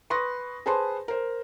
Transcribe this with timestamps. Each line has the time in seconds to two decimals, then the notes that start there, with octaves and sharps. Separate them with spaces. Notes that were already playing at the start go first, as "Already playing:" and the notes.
0.10 B4 C6 C#6 D#6 A#6
0.66 G#4 B4 C5 A5 B5 C6
1.08 A#4 C5